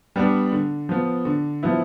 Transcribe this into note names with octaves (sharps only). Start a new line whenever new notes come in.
G3 B3 D4
D3
F3 B3
D3
F3 B3 E4